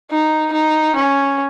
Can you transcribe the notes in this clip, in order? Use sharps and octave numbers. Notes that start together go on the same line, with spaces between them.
D#4
D#4
C#4